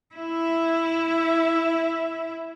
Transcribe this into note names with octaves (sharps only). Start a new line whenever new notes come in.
E4 E5